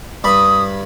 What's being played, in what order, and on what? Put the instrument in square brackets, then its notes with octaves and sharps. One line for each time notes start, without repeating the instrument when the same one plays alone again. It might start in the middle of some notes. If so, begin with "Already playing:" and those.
[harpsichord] G2 B5 [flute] D#6